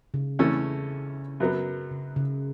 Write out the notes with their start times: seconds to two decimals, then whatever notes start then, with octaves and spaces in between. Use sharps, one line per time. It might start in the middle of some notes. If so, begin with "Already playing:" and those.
0.14 C#3
0.39 E2 E3 A3 C#4 A4
1.40 F#2 F#3 B3
1.91 C#3
2.16 C#3